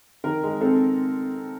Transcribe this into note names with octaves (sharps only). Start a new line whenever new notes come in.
D#3 A#4
G#3
C4 A4